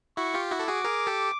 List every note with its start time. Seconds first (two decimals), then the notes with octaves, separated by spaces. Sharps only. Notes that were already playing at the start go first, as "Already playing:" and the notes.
0.17 E4 F#4 C#6
0.34 F4 G4
0.51 E4 F#4 D6
0.60 A4
0.68 F#4 G#4
0.85 G#4 A#4
1.07 G4 A4